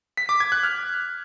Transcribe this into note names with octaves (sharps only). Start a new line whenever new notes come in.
B6
D6
G#6
F#6
F6